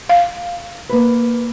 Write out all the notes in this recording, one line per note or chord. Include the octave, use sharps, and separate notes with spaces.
F5
A#3 B4